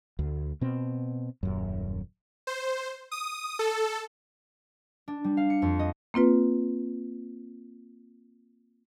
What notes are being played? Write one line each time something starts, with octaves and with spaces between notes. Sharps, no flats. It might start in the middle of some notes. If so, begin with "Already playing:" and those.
D2
B2 C4
D#1 F#2
C5
D#6
A4
D4
G3
F5
C#7
F2
D#5
A#3 C4 F4 B4